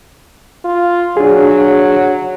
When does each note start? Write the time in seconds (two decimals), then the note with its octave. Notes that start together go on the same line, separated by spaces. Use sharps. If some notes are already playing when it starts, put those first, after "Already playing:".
0.65 F4
1.17 F#3 D4 G#4